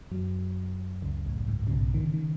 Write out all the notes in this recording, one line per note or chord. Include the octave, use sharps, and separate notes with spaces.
F#2 F#3
C#2 C#3
A1 A2
G#2
C#3
B1 B2
D#3
C#3
D#3